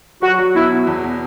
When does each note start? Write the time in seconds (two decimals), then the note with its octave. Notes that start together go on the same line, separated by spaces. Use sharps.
0.22 F#3 F#4
0.38 F#3
0.55 B2 E4
0.70 B2
0.87 E2
1.03 B2